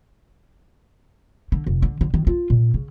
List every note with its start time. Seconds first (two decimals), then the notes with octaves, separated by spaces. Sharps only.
1.52 D3
1.67 F1
1.82 D3
2.01 D3
2.14 D#3
2.27 F4
2.50 A#2
2.74 C#3